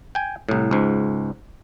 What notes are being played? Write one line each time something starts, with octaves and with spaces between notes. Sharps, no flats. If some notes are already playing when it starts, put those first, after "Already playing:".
G5 G#5
C2 A2
C#2 G#2